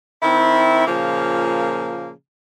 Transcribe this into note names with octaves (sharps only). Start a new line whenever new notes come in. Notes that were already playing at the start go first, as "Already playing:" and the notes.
D#3 C4 E4
A#2 C#3 F3 A#3